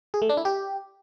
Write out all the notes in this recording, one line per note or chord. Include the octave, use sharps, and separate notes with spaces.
G#4
A3
D4
E4
G4